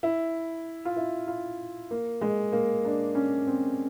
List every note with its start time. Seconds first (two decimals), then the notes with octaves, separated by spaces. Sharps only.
0.03 E4
0.85 F4
0.97 E4
1.28 F4
1.91 A#3
2.21 G#3
2.52 A#3
2.85 D4
3.15 C#4
3.47 C4